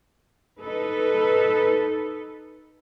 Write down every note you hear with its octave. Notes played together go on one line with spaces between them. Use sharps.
D#4 A4 B4